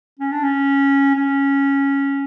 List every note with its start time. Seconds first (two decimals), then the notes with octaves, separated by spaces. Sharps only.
0.19 C#4
0.32 D4
0.43 C#4
1.15 C#4